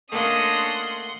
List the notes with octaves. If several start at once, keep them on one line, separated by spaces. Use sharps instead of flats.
A3 A#3 C#4 D4 D#5 F#5 C6 D#6